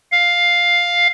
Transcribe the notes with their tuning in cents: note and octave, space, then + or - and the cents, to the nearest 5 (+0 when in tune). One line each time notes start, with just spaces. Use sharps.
F5 +5